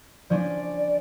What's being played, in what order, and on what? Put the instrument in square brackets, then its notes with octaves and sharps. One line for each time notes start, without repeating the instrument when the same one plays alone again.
[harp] F3 C#4 D4 [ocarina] D5